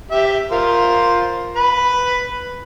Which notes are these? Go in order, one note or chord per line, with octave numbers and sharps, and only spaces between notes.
G4 E5
F4 A#4 C5
B4 B5